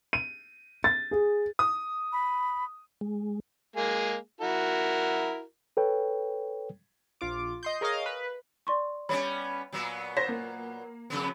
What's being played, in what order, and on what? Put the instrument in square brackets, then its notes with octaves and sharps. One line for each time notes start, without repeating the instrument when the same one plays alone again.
[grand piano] D#7
A6
G#4
[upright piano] D#6
[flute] B5
[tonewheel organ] G#3
[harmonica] G#3 A#3 G#4
E4 F#4 A#4
[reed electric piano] A4 B4 C#5 G5
[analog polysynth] A#1 F4 D6
D#5 C6 G6
G#4 A#4 C#5 D#5 F5
B4
[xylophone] D5 C6 C#6
[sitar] G3 B3 C#4 [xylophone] C#5 B5
[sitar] A#2 F#3 B3
[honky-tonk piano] C5 [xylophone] A#6 B6
[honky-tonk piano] A#3
[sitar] F2 C#3 B3